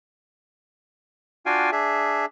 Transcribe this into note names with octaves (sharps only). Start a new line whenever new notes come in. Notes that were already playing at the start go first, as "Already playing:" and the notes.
D4 F4 F#4 F5 G5 G#5
D4 G#4 E5